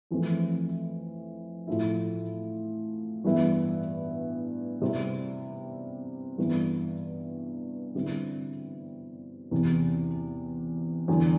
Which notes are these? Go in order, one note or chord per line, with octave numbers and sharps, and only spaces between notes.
F2 E3 A3 C4 E4
A2 F3 A3 E4
G2 E3 G3 B3 E4
C3 G3 C4 E4
G2 E3 B3 E4
D3 G3 C4 E4
E2 C3 E3 B3
E2 D3 G3